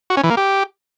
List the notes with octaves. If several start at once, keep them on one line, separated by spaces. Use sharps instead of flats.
F#4
C#4
E3
A#3
G4